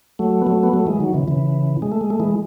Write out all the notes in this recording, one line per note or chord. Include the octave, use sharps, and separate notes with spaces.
F#3 A3
B3
F#3 A3
B3
F#3 A3
E3 G#3
D#3 F#3
C#3 E3
C#3 E3
G#3
A3
G#3
A3
E3 G#3